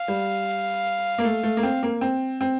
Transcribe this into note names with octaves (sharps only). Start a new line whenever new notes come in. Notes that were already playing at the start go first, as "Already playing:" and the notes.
Already playing: F5
G3
A#3
A3
A3
A#3
C4
A#3
C4
C4